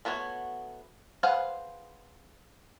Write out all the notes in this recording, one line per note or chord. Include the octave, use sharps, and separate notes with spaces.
A3 B3 F#4 C#5
G#4 B4 C5 F5 F#5